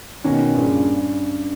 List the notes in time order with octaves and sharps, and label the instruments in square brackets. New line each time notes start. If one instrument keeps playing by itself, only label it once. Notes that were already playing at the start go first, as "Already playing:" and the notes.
[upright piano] B2 D#3 [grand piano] C#4
[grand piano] G2 [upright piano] A#2 C#3